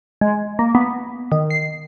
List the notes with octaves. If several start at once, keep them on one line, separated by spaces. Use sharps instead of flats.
G#3
A#3
B3
D#3
C7